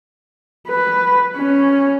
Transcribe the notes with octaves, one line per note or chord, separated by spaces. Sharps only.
B4
C#4